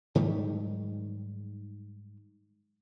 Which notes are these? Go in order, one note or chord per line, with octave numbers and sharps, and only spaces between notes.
G#2 D#3 F#3 G3